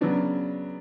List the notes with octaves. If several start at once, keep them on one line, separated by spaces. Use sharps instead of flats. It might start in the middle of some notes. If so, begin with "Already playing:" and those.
C#3 F#3 B3 D4 F#4